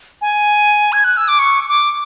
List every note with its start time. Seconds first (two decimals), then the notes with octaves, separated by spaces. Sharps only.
0.22 G#5
0.93 G#6
1.04 F#6
1.17 E6
1.28 D6
1.39 C#6
1.69 D6